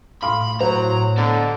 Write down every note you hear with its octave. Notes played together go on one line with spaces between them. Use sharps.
A2 F5 B5 C6
F#3 C5 A#5
B2 D3